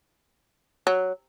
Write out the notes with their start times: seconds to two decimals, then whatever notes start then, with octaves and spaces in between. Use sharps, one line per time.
0.87 F#3